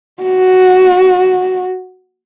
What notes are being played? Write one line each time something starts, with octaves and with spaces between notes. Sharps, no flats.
F#4